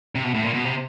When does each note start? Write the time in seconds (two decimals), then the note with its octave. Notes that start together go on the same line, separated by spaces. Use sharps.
0.15 C3
0.24 B2
0.34 A2
0.44 A#2
0.54 B2
0.65 C3